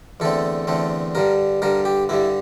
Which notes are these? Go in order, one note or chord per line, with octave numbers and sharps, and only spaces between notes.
E2 D3 A3 C4 A4
E2 D3 A3 C4
G2 D3 G3 A#4
G2 D3 G3 A#4
G4
G2 D3 G3 E4